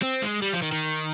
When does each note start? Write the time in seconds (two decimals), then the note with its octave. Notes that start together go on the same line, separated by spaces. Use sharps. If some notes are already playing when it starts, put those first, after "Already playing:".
0.03 C4
0.22 G#3
0.42 G3
0.53 F3
0.62 D#3
0.72 D#3